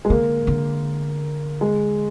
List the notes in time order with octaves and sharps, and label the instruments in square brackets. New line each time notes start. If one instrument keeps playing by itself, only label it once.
[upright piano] G#3
[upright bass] D3 [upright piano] A#3
[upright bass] D3
[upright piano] G#3